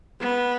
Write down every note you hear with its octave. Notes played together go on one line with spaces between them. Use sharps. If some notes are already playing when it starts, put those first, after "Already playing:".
B3